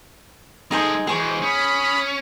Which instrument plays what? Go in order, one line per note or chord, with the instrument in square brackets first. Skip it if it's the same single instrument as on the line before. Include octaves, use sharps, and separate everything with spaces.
[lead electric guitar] G#3 A4 [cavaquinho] D#4 G#4 C5
[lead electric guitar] E3 G#3 [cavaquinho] G#4 C#6 [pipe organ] C5
[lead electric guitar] C#4 [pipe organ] B5 D#6